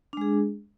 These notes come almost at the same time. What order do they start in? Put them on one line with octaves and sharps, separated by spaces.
D4 G#3 G#4